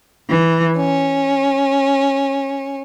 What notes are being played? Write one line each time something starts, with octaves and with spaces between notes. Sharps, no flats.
E3
C#4